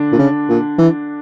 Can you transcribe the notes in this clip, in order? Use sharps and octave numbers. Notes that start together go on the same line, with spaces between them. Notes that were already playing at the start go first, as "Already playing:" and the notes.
Already playing: D3 D4
A#2
C#3
A#2
E3